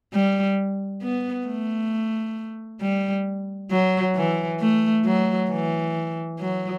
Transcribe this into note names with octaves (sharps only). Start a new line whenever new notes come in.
G3
B3
A3
G3
F#3
E3
A3
F#3
E3
F#3